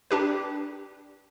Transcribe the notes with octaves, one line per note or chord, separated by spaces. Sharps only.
D4 G4 B4